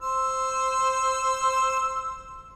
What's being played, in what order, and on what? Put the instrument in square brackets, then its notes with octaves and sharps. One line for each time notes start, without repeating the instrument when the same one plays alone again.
[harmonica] C5 E6